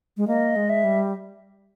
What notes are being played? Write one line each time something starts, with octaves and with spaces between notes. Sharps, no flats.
G#3
A#3 D#5
G#3
E5
G3